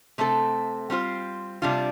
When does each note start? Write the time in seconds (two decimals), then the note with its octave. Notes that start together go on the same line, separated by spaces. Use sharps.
0.18 C3 A3 C4 A4
0.90 G3 C4 F4 C5
1.62 C3 G3 D4 F4